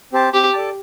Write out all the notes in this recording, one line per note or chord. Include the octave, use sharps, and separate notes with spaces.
C4 G4 C5 A5
C4 G4
A4 D5 A5